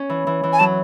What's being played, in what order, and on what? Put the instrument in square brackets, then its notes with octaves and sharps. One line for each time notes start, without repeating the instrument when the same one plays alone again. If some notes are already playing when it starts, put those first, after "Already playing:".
Already playing: [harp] C#4
E3
E3
E3
[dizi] G#5
[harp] F#3 [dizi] A5